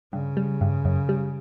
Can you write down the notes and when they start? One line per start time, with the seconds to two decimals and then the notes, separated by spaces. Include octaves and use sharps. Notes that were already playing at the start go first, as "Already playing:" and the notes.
0.13 G2 C#3
0.37 G3
0.61 G2
0.85 F#2
1.09 G3